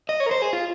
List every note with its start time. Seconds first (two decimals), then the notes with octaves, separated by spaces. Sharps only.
0.09 D#5
0.20 C#5
0.26 A#4
0.31 C5
0.42 G#4
0.53 F4